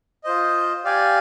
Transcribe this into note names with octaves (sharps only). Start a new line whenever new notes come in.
F4 C5 D#5
G4 D5 F5 G#5